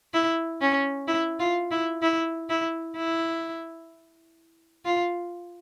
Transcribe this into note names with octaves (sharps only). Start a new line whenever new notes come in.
E4
C#4
E4
F4
E4
E4
E4
E4
F4